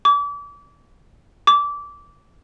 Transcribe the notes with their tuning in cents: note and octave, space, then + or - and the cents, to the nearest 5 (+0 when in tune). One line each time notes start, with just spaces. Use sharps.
D6 -35
D6 -20